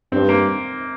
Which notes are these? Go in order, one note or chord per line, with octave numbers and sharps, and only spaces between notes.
G2 C4
A#3